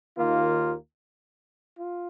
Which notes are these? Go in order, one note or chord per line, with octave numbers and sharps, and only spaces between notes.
D#2 D#3 A#3 F4
F4